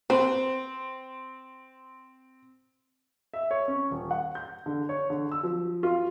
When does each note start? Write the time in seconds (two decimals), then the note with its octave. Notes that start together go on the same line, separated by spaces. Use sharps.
0.10 C4 B4 C5
3.34 E5
3.51 C#5
3.68 C#4
3.91 D#1
4.11 F#5
4.35 G6
4.66 D3
4.89 C#5
5.10 D3
5.32 E6
5.43 F3
5.83 F4